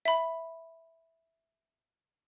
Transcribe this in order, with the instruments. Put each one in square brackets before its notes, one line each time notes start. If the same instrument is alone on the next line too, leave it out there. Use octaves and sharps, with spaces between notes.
[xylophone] E5 B5